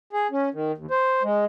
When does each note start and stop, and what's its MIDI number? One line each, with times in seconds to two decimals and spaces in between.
0.13 0.27 68
0.31 0.49 61
0.54 0.72 51
0.78 0.86 39
0.91 1.22 72
1.23 1.45 56